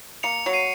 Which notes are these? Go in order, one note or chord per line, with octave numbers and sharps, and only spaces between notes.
A#3 C#7 F7
F#3
C7 D#7